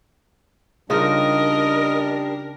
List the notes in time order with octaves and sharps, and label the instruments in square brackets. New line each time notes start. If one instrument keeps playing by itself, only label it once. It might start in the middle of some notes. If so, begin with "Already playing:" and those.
[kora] C#3 D#4 F4 [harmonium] G3 D4 [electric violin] A#4 [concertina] D#5